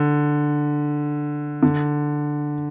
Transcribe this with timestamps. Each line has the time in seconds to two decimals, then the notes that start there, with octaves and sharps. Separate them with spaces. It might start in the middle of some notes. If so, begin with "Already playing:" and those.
Already playing: D3
1.63 D3